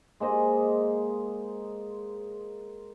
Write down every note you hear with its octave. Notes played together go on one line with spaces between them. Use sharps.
G#3 A#3 C5 D#5